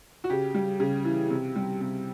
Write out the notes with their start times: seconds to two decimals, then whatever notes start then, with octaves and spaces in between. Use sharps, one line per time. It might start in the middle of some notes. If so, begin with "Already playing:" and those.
0.24 F#4
0.30 C#3 G4
0.54 G3
0.80 C#3
1.05 E3
1.30 C3
1.56 G3
1.81 C3